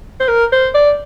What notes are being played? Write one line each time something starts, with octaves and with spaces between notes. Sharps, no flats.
C5
A#4
C5
D5